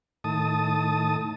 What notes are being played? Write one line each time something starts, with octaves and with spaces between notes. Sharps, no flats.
A2 D#3 A5 D#6